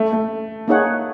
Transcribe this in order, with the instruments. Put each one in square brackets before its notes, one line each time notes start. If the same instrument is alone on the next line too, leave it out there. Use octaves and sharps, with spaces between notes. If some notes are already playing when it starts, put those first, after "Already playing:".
Already playing: [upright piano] A3
A3
[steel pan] A#3 D#4 G#4 C#5 F#5